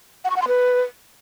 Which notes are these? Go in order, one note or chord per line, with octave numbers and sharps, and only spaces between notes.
F#5
C#6
F#5
C6
B4